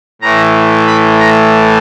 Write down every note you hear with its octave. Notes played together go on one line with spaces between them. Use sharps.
A2 E3 A3 A#5
B5
A#5